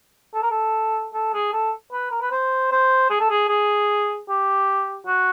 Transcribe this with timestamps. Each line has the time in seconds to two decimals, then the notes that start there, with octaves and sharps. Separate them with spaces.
0.34 A4
0.43 A#4
0.51 A4
1.14 A4
1.33 G#4
1.53 A4
1.92 B4
2.11 A#4
2.22 B4
2.31 C5
2.71 C5
3.10 G#4
3.20 A4
3.30 G#4
3.49 G#4
4.29 G4
5.07 F#4